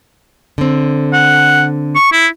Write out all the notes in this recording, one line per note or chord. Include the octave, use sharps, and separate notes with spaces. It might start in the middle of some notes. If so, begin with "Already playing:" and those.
D3 C4
F#5
C#6
E4